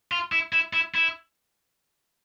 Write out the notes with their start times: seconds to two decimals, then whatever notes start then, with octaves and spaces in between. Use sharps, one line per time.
0.12 F4
0.32 E4
0.53 E4
0.73 E4
0.95 E4